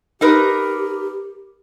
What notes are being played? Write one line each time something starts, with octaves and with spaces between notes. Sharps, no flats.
D#4 G4 A#4 B4